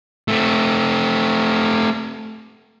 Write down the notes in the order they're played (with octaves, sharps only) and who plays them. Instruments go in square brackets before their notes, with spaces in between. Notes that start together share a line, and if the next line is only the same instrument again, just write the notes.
[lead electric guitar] A3 C4